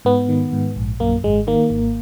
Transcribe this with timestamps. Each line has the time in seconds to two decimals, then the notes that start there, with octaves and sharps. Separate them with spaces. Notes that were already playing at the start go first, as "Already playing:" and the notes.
0.05 G#2 B3
0.29 D#3
0.53 G#2
0.76 A#1
1.00 F#2 A#3
1.24 G#1 G#3
1.47 D#3 A#3
1.70 G#1